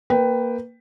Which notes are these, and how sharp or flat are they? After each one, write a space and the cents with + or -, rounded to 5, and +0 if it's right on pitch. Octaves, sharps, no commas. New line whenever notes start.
A#3 +0 B4 +15 G5 +0